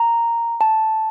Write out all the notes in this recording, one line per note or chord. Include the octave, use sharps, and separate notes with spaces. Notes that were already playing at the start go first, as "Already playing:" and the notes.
Already playing: A#5
A5